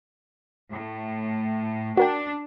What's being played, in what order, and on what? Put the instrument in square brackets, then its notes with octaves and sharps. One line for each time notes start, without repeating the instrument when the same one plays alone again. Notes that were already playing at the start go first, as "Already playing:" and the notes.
[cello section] A2
[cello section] D4 [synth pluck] F#4 A#4 G5